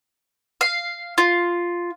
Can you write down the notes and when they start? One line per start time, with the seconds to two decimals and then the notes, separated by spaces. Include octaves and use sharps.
0.61 F5
1.18 F4